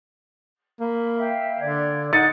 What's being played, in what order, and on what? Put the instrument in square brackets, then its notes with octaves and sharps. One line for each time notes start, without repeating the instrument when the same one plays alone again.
[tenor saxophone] A#3 [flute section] B5
[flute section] E5 F5 G5
[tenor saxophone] D3 [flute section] D5 G#6
[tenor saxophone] D#4 [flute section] F#5 B5 [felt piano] A6 C#7